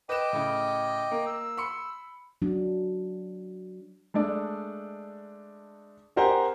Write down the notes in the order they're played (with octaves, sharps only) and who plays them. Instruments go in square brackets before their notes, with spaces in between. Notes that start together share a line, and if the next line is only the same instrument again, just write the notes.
[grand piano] B4 E7 [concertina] D#5 G5 D6
[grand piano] A2 C#3
A#3
[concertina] E6
[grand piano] B5 C6 C#7
[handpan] F#3 D4
[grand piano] G#3 A3 D4 D5
C4 G4 A#4 C5 F#5 G#5